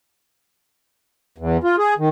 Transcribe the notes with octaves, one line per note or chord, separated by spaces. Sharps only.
E2
F4
G#4
D#3